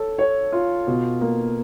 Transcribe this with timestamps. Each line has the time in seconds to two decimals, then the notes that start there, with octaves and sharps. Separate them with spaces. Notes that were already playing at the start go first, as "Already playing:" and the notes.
Already playing: A4 C#5
0.18 C#5
0.52 F4
0.87 B2
1.21 A#3